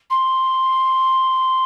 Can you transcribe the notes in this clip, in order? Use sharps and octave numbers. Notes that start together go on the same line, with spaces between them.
C6